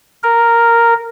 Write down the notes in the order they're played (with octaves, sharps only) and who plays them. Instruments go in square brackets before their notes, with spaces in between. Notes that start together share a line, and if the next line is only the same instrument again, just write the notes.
[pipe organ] A#4